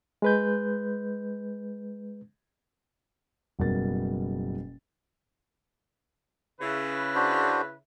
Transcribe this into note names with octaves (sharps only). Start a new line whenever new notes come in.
G#3 B4 G6
F#1 B2 G3 A#4 A6
C#3 E4 B4
D4 F#4 C5